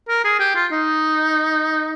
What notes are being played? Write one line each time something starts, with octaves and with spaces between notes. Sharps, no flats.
A#4
G#4
G4
F4
D#4